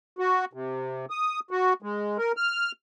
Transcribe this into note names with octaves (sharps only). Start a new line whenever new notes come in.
F#4
C3
D#6
F#4
G#3
A#4
F6